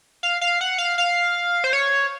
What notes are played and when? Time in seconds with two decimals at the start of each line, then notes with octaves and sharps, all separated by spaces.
0.23 F5
0.41 F5
0.61 F#5
0.78 F5
0.98 F5
1.64 C5
1.73 C#5